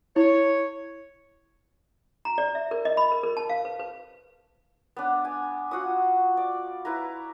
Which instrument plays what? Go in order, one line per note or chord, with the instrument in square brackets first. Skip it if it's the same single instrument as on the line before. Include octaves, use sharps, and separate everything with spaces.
[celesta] E4 [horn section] C#5
[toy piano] A#5
D5
E5
A#4
D#5
B5
A#4
A#4
A5
F5
B4
B4
[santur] B3 D4
G#5
F4 F#4 F#5 D#6
D5
E4 B4 A#5